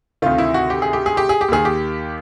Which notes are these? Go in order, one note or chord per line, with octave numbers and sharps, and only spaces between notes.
D2 C3 D#3 F4
E4
F#4
G4
G#4
G4
G#4
G4
G#4
G4
D#2 D#3 G#4
G4